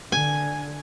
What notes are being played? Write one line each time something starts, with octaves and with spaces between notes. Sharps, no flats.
D3 G#5